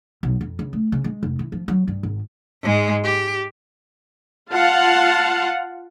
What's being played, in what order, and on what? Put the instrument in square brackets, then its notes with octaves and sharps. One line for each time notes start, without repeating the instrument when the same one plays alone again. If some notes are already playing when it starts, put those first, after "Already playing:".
[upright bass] B1
F2
C#2
A3
C#3
G#3
F1
E3
F3
F#3
G2
G#1
[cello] G#2 G#3
G4
[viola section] F4 F5 F#5 A5